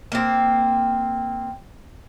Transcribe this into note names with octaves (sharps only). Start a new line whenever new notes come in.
A#3 C4